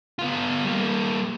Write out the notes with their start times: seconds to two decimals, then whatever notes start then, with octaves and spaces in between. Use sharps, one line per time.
0.19 B3 F4
0.64 G3 A#3